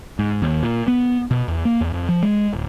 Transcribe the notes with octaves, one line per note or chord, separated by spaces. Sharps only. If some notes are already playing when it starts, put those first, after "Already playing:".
G#2
D#2
A#2
B3
B2
E2
A#3
E2
F2
F3
G#3
D1